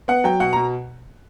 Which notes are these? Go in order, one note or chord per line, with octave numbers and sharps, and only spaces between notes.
B3 F#5
F#3 G5
B2 F#5
B2 A#5